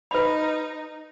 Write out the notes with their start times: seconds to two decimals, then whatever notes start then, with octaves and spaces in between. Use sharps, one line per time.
0.11 D#4 B4 B5